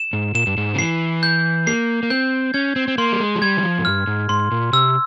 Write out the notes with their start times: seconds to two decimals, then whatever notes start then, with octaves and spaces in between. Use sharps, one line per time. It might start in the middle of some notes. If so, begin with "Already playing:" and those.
Already playing: E7
0.13 G#2
0.35 A#2 E7
0.47 G2
0.57 G#2
0.74 C#3
0.78 E3 C7
1.23 G6
1.67 A#3 C7
2.03 A#3
2.10 C4 G6
2.54 C#4 G#6
2.76 C4
2.88 C4
2.98 A#3 C6
3.13 G3
3.20 G#3
3.36 F3
3.42 G3 G#6
3.57 E3
3.63 F3
3.78 G#2
3.85 G2 F6
4.07 G#2
4.29 G#2 C6
4.51 A#2
4.73 C3 E6